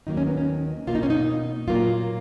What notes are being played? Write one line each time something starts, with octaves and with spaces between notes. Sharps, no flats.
D#2 D#3 F#3 A#3 D#4
C#4
B3
C#4
B2 A#3 F4
D#4
C#4
D#4
A#2 F#3 A#3 F4